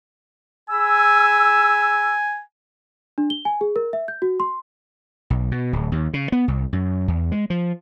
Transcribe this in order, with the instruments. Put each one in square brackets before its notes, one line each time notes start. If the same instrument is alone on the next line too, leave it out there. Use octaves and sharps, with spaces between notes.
[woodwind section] G#4 B5 E6 [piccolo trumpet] G#5
[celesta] D4
G7
G#5
G#4
A#4
E5
G6
F#4
C6
[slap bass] B1
B2
D1
D#2
C#3
B3
C2
F#2
E2
G#3
F3